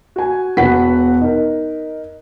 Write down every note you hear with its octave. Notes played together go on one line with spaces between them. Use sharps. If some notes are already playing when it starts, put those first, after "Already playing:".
F#4 G#5
E1 B3 F#4 B4 F#5 B6
D#4 A#4